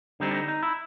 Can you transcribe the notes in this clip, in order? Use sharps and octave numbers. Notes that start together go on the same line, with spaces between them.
D3 G3 C4 D#4
D4
D#4
D#4
E4